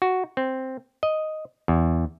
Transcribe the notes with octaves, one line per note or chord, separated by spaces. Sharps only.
F#4
C4
D#5
E2